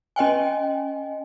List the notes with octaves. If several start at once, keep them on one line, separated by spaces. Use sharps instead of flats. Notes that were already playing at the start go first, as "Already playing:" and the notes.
C#4 D#5 G5 G#5